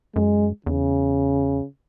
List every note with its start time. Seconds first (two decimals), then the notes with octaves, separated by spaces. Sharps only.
0.16 F#2 G#3
0.66 E2 C#3